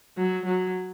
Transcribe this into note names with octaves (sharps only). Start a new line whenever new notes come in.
F#3
F#3